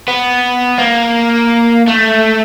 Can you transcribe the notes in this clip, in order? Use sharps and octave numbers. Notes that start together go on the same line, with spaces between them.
B3
A#3
A3